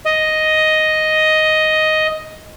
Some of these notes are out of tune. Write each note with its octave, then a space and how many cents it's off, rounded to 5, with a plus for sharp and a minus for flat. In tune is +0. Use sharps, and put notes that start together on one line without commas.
D#5 +5